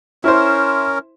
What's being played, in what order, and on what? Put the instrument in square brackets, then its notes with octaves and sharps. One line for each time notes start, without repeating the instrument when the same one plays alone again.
[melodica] C#4 A#4 [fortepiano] E4 C5